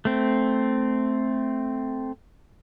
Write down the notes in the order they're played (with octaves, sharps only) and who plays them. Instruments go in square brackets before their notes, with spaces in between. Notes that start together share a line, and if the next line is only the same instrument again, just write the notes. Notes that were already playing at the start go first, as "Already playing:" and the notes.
[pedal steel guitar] A3 C4